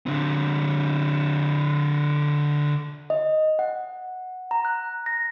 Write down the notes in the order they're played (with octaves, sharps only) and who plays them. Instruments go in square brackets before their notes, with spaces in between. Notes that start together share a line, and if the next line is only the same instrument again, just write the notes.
[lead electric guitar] D3 C4
[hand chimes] D#5
F#5
A#5
F#6
A#6